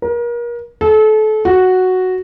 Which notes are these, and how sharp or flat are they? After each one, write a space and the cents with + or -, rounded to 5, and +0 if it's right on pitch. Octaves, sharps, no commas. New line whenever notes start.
A#4 +35
A4 -30
F#4 +0